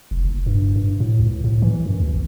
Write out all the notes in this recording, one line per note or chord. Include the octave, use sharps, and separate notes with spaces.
F1
F#1
G2
G2
A2
C#2
A2
E3
F#2
D2
G#1